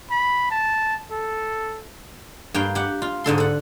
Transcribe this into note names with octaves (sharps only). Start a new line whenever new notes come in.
B5
A5
A4
G2 A#3 G5
G4 F#5
F4
G#2 D3 A4 C6
A4 F#5